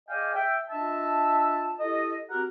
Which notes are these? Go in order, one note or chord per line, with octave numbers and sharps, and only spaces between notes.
G#4 D5 D#5 F5 G5 G#5
E5 G5
D4 F4 D#5 E5 A5
E4 G4 A4 D#5
C4 F#4 G4 A#4 F#5 A#5